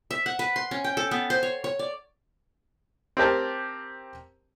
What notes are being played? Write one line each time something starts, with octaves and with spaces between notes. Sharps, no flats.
E5
F#5
B4
C6
C#4
G5
A4
B3
C5
C#5
C#5
D5
C4 G4 A#4 A5